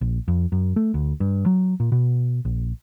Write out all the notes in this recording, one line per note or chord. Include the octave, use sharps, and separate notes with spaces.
A#1
F2
F#2
A3
D2
G2
F#3
A#2
B2
A#1